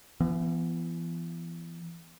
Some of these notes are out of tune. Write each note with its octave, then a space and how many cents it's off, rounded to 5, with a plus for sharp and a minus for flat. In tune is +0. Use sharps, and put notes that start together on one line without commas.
E3 +35 B3 +0